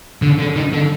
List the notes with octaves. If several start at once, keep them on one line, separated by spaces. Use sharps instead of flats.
D3
D3
D#3
D3